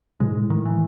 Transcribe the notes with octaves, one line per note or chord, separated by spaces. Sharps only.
A2 G#3
G#2
A2
D#3
E3